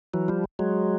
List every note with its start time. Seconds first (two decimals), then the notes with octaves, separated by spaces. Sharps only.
0.14 E3 F#3
0.28 F3 G3
0.59 F#3 G#3